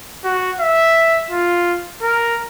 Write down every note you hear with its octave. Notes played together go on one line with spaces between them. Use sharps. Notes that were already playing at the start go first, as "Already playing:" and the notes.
F#4
E5
F4
A#4